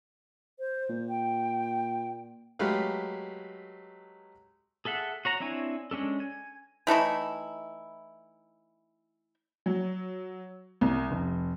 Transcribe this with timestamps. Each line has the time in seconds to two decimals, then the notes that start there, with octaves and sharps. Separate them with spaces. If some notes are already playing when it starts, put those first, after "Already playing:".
0.60 C5
0.89 A#2
1.09 G5
2.59 F#3 G#3 A3 G4 B4 F5
4.85 G#4 A4 E5 F#5
5.25 F#4 C#5 A#5
5.40 C4 D4 E4 C#5 G#5
5.91 G#3 C#4 D4 A4
6.20 G#5
6.87 E3 A3 D#4 E4
9.66 F#3
10.81 C2
11.11 F1